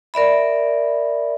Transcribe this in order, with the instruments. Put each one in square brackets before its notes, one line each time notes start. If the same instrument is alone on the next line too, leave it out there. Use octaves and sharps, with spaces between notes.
[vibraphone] A#4 D5 E5 B5